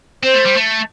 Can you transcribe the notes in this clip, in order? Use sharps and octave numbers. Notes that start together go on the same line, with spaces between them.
C4 C5
A3
G3
A3